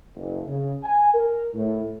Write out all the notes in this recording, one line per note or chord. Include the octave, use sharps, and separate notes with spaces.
F#1
C#3
G#5
A#4
A2